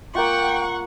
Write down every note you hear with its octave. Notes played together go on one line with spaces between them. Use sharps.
A#3 F4 F#5 G5 C#6